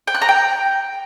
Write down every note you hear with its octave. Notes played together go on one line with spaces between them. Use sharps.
G5
F#6
A#5
G5